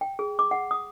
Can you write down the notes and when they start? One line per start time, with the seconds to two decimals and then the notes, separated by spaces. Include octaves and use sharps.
0.01 G5
0.19 G#4
0.39 D6
0.51 F#5
0.71 D#6